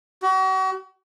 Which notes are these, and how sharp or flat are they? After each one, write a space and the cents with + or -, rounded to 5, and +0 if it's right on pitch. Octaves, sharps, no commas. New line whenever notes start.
F#4 +40